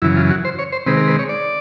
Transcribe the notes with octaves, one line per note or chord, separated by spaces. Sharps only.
F#2 C#3 E3 E4
F4
F#4
C5
C#5
C5
C3 D#3 G#3 C4 B4
A#4
B4
C#5
D5